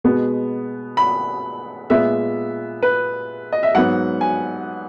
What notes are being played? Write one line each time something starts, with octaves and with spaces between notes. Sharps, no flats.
B2 G#3 B3
B5
A#2 G#3 B3 E5
B4
D#5
E5
G#2 F#3 B3 F#5
G#5